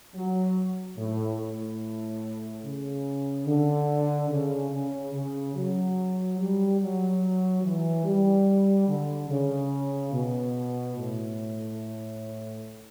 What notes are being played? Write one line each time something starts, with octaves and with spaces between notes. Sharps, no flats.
F#3
A2
A2
C#3
D3
C#3
C#3
C#3
F#3
G3
F#3
E3
G3
D3
C#3
B2
A2